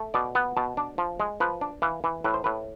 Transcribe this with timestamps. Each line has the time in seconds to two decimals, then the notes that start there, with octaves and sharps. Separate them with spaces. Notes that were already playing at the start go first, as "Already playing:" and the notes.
Already playing: A3
0.14 B2 D5
0.35 B3
0.57 B2 A5
0.77 D4
0.98 F3
1.20 G#3
1.40 F3 B4
1.61 D4
1.82 E3 F5
2.04 E3
2.24 A2 B4
2.34 C5
2.44 A2 B4